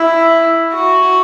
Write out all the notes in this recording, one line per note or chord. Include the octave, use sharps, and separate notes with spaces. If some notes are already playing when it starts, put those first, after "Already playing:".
Already playing: E4
F#4